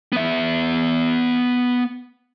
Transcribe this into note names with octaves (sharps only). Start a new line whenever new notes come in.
B3 E5